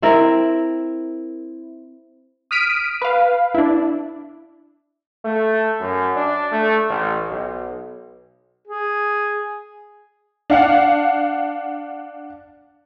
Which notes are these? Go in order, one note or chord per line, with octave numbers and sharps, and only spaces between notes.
C4 E4 A#4
D#6 F6 B6 D7 D#7
B4 F5
D4 E4
A3
F#2
D4
A3
A1
B1
G#4
D4 F5 F#5